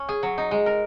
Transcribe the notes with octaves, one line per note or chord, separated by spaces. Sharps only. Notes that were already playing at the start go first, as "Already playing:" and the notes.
Already playing: C#4
G#4
F#3
D#4
G#3
A#4